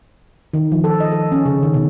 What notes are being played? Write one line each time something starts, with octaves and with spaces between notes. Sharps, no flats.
D#3
F3
A4
D#5
A4
C#4
C#3
D#3
B2